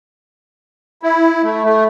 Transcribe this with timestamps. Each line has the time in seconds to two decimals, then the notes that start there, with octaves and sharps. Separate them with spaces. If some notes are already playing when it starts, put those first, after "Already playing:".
1.03 E4
1.43 A3
1.64 A3